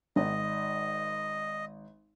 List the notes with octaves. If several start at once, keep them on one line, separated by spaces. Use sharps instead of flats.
G#1 D#5